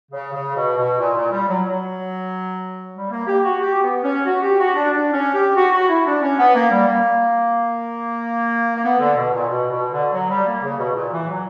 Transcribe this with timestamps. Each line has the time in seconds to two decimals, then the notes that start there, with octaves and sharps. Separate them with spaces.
0.12 C#3
0.33 C#3
0.55 B2
0.77 B2
0.99 A#2
1.15 A#2
1.31 G3
1.48 F#3
1.64 F#3
2.94 G3
3.10 A#3
3.27 G4
3.43 F#4
3.60 G4
3.82 B3
4.03 C#4
4.26 F#4
4.41 G4
4.58 F#4
4.74 D4
4.90 D4
5.13 C#4
5.34 G4
5.55 F#4
5.72 F#4
5.88 E4
6.05 D4
6.21 C#4
6.37 B3
6.54 A#3
6.70 G3
6.86 A#3
8.75 A#3
8.83 B3
8.99 D3
9.16 B2
9.32 A#2
9.48 B2
9.70 B2
9.91 D3
10.13 F#3
10.29 G3
10.46 A#3
10.63 C#3
10.78 B2
10.95 A#2
11.12 E3
11.28 F#3